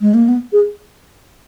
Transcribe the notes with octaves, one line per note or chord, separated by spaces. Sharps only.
G#3
A#3
B3
G#4